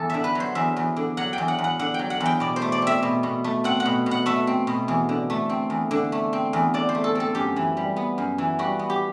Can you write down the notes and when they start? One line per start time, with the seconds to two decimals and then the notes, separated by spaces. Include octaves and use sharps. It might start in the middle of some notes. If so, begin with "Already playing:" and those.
Already playing: E2 A4
0.10 D3 E5
0.24 B4
0.35 F#3 C5
0.55 E2 E5
0.76 E2
0.96 D3
1.17 F#3 F#5
1.33 G5
1.38 E2
1.48 F#5
1.58 E2
1.64 F#5
1.79 D3 F#5
1.94 F#3 G5
2.10 F#5
2.20 E2
2.26 G5
2.40 B2 D5
2.56 C5
2.62 A3
2.72 D5
2.82 C4 E5
3.03 B2
3.23 B2
3.44 A3
3.64 C4 F#5
3.80 F#5
3.86 B2
4.06 B2
4.11 F#5
4.26 A3 E5
4.47 C4
4.67 B2
4.88 E2
5.09 D3
5.30 A3
5.49 C4
5.70 E2
5.91 D3
6.12 A3
6.33 C4
6.53 E2
6.74 D3 D5
6.89 C5
6.95 A3
7.04 A4
7.15 C4 A4
7.35 F#2 G4
7.56 E3
7.77 G3
7.96 B3
8.18 F#2
8.38 E3
8.59 G3 F#4
8.79 B3
8.90 G4